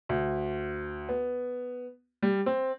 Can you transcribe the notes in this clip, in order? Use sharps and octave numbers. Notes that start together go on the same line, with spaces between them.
D2
B3
G3
C4